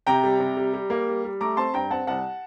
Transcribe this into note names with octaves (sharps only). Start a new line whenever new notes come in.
C3 G5 A#5
G3
C3
G3
G3
A#3
G3
G3
A3 A#5 D6
C4 A5 C6
G2 G5 A#5
C4 F#5 A5
C2 F#5 A5